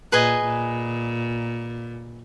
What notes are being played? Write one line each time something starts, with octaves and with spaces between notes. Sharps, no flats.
A#2 G#4 B4 D#5 G#5
A#2